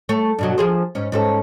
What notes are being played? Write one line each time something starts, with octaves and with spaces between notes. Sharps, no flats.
A3 C#5
G2 B2 F#3
F3 G#4 C5
G#2 C#4
G#2 C#4 A4